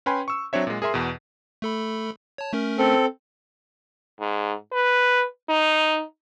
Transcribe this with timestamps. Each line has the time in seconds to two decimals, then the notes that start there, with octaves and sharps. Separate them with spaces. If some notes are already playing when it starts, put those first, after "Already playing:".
0.06 C#4 B4 G5 G#5 B5 C6
0.28 C#6 E6
0.53 F#3 C4 D4 C#5 E5
0.67 A#2 G#3
0.82 G#4 A#4 E5 C6
0.94 E2 B2
1.62 A3 A4 B5
2.38 C#5 A5
2.53 A3 C#4 A#4
2.78 C4 A4
4.20 G#2
4.72 B4
5.49 D#4